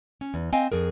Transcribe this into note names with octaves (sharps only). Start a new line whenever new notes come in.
C#4
E2
C4 D#5 F5 G5 G#5
F2 G#4 A#4